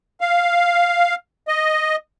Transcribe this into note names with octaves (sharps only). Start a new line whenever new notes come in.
F5
D#5